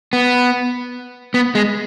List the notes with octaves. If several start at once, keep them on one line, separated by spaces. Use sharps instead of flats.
B3
B3
G#3